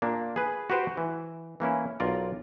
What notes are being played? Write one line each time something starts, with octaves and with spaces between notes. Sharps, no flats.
A#2 A#3 D4
G#4 B4
F#4 G4 B4 C5 G5
E3
E3 A#3 C#4 E4
B1 F4 A#4 D5